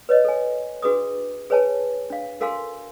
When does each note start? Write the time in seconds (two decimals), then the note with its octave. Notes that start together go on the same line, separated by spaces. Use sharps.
0.09 B4 C#5 D#5
0.24 A4 G#5
0.82 D4 F#4 G#4 B4 D6 D#6
1.50 G#4 B4 C#5 G#5 A5
2.10 D4 F5
2.40 F#4 A4 A#4 F5 G#5 C6